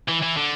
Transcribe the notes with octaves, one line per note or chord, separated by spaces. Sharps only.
E3
E3
D3